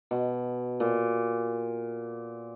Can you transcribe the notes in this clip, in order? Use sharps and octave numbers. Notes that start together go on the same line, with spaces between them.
B2
A#2